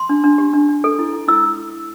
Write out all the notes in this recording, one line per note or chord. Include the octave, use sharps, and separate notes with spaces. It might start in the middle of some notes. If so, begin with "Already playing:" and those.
Already playing: C6
D4
D4
G4
D4
D4
A4
E4
E4
E4 E6